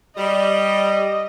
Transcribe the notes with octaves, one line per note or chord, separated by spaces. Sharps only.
G3 D#5